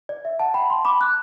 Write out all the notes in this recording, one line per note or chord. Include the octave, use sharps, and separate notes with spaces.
D5
E5
F#5 A5
G5 B5
A5 C6
B5 D6
D6 F#6